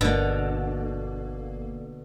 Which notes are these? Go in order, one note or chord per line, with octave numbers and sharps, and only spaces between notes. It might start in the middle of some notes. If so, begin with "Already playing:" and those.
G1 B2 D3 A#3